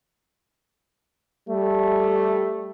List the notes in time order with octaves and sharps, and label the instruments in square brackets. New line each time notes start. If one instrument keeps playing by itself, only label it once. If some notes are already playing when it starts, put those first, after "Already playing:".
[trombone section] G3 A3